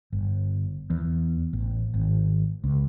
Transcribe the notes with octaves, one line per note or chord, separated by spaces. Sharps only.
G1
E2
A1
G#1
C#2